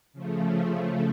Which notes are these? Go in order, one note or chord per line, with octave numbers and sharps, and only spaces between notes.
C#3 F3 A3